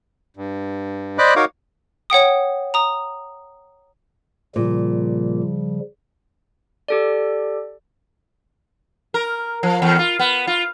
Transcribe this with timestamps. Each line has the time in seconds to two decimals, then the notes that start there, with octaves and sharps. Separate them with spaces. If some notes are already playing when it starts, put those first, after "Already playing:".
0.37 G2
1.18 C5 D5 D#5 B5 D6 F#6
1.36 D#4 F#4 A#4 C#5 F5 D6
2.10 C#5 F#5 G5 D#6
2.74 A#5 D#6
4.56 A#2 C#3 F3 G3
6.88 G4 A4 D5
9.14 A#4
9.63 F3
9.82 E2
9.99 F4
10.19 B3
10.47 F4